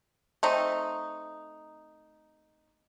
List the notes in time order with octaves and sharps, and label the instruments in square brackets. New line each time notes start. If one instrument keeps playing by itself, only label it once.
[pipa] A3 C4 D#4